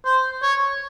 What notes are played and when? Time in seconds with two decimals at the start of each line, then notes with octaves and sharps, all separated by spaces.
0.05 C5
0.42 C#5